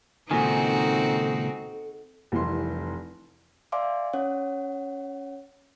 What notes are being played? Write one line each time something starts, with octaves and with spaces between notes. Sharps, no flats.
C#2 A#2 D#3 C4 D#4 F#4 A4 G#5
F1 C2 E3 C6
D5 E5 F5 G#5 C6 D6
C#4 C#5 F#5